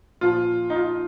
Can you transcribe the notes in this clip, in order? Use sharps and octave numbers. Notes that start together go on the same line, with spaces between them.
A#2 F3 F4
D#4
F4